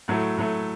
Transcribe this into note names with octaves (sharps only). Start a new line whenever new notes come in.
A2 F#3 A3
A2 F#3 A3